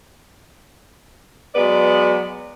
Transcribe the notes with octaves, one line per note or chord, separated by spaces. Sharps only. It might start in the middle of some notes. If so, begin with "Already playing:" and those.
F#3 G#3 B3 B4 D5